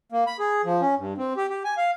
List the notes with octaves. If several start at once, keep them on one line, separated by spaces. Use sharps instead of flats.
A#3
B5
G#4
F3
C#4
G2
C4
G4
G4
G#5
F5